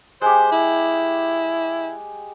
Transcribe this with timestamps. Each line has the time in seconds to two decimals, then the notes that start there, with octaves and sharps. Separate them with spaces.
0.22 G#3 G4 C5
0.52 E4